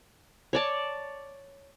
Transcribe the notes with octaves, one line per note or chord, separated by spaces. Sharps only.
C#5 D5 A5